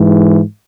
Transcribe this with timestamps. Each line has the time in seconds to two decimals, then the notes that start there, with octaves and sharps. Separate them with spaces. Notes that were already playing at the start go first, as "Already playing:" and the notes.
Already playing: G#2 E3